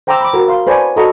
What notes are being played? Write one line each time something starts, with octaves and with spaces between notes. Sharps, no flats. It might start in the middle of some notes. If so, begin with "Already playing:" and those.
C5 G5 A#5 C6 D6 E6
B5 D6
F#4 A#4
F5 C6
B4 C5 D5 G#5 A5 C#6
F#4 A4 D#5 A#5 B5 C#6